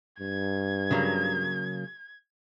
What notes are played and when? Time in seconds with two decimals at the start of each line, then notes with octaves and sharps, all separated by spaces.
0.20 G2 G#6
0.91 C#3 F#3 A#3